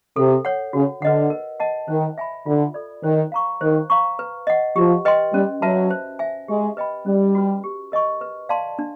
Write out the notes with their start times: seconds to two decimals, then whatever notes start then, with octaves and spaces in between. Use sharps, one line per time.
0.16 C3 A4
0.45 C#5 F#5
0.73 C#3 F#4
1.02 D3 B4 D#5 F#5
1.30 A#4
1.60 D#5 F#5 A5
1.88 D#3 C5
2.18 E5 G#5 B5
2.46 D3 F4
2.74 A4 D5
3.03 D#3 C5
3.32 F5 A#5 C#6
3.61 D#3 C5
3.90 F5 A#5 C#6
4.19 B4
4.47 D#5 F#5
4.76 F3 G4
5.05 B4 D#5 G5 C6
5.33 G3 C#4
5.62 F#3 F#4 B4 E5 A5
5.90 C5
6.19 E5 G#5
6.48 G#3 G4
6.77 B4 D#5 G5 B5
7.06 G3 C#4
7.35 F#4 B4
7.64 G4
7.92 A#4 D#5 G#5 C#6
8.21 B4
8.49 D5 F5 A5 C6
8.79 D4